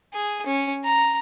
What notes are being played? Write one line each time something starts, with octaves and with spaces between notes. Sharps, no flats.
G#4
C#4
A#5